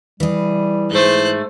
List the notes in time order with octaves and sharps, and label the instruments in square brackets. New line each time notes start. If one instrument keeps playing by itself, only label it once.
[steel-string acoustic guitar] E3 G#4 [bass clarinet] G3
[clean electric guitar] G#2 A3 [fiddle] C5 F#6